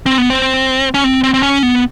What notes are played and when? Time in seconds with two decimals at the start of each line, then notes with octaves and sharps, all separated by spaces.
0.06 C4
0.18 B3
0.30 C4
0.94 C#4
1.04 C4
1.24 C4
1.34 C4
1.43 C#4
1.63 B3